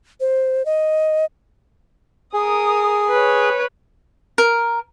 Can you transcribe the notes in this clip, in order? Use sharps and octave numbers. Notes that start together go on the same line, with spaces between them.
C5
D#5
G#4 A#4 D#6
B4 C#5
A#4